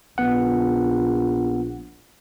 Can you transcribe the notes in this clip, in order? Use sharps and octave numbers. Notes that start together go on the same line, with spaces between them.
A#1 B3 F#5